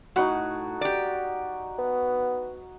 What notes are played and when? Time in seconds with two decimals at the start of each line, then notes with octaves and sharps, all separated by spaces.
0.16 A2 D#4 F#4
0.81 G4 D5
1.79 B3